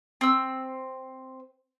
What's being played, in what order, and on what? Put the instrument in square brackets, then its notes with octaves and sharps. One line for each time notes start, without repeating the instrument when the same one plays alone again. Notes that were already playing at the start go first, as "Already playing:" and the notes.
[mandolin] C4 E6